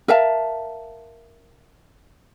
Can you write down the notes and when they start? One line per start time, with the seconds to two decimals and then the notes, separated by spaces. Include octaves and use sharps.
0.08 A#4 E5 F5 A5